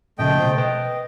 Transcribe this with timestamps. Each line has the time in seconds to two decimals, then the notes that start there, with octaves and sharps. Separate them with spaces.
0.19 A#2 C#3 F3 A3 D#5 G5
0.37 B2 C5
0.57 B4 D#5 G5